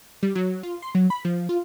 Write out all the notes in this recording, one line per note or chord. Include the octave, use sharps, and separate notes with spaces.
G3
F#3
F4
C6
F#3
B5
F3
F4